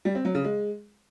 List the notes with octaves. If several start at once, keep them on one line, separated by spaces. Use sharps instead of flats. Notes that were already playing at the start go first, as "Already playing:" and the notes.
G3
C4
F#3
C#3
G#3